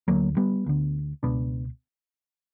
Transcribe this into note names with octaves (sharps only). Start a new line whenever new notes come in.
D2 D3 F#3 A#3
G3 B3
D2 D3
C#2 B2 B3 D4